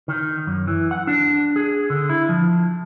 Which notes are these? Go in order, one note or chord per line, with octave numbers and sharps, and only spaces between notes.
D#3
F#2
E3
F#5
D4
G#4
D3
E4
F3